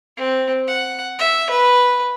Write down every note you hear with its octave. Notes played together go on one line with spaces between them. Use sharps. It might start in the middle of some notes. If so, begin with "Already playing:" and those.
C4
F#5
E5
B4